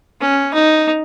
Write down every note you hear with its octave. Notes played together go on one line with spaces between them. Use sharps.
C#4
D#4